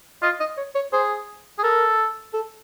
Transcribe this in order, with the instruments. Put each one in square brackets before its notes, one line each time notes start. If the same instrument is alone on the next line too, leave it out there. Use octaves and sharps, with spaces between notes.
[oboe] F4 [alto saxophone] D#5
[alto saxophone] D#5
C#5
C#5
[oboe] G#4 [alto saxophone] C5
[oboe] G#4
[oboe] A4 [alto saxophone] A#4
[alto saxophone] A4